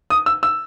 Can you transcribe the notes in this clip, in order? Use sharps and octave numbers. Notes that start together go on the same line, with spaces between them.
D#6
E6
E6